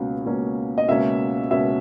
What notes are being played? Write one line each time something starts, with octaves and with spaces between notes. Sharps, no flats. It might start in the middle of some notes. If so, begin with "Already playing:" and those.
Already playing: C#2 B2 A#3 C#4
C#2 B2 A#3 C#4
D#5
C#2 B2 A#3 C#4 E5
C#2 B2 A#3 C#4 E5